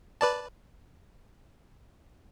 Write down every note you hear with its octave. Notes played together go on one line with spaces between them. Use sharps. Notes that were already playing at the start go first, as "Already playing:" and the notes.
B4 D5 A5